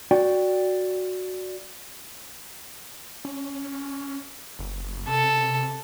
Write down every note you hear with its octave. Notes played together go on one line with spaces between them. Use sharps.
F#4 D5 G5
C#4
F#1
C3 A4